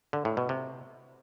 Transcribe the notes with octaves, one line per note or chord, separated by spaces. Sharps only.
D3
A2
B2
C3